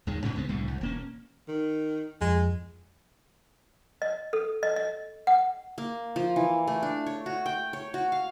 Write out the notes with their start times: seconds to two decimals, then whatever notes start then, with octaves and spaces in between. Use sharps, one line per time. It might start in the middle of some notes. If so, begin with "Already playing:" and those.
0.07 D#2 D#3 G#3
0.24 G2 B2 D3 C#4
0.36 C#2 G#3 B3 C4
0.48 C2 A2 D3 G3
0.68 C2
0.81 E1 A#3 C#4
1.48 D#3
2.22 F2 G#3
4.02 D#5
4.33 A4
4.63 D#5
4.76 D#5
5.27 F#5
5.78 A#3
6.16 F3
6.36 E3
6.67 A3
6.83 D4
7.06 C#5
7.26 F#4
7.46 G5
7.73 C#5
7.94 F#4
8.12 F5